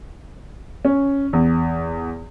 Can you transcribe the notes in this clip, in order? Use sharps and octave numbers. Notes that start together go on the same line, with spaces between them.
C#4
E2